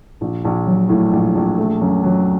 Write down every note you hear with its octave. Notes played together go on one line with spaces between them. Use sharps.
A#1
A#1
F#3
A2
A#1
A#1
A3
F#2
F#3